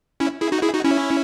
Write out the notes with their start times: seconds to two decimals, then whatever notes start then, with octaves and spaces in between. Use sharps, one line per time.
0.20 C#4 E4
0.41 E4 G#4
0.52 D#4 F#4
0.62 E4 G#4
0.74 D#4 F#4
0.84 C#4 E4